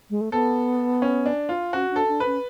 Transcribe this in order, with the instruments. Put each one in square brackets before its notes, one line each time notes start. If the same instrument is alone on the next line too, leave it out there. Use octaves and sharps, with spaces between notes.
[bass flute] G#3
A3
[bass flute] B3 [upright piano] A4
[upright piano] C#4
D4
F4
[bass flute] C#4 [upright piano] F#4
[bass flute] D4
[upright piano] A4
[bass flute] D4
[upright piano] B4
[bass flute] C#4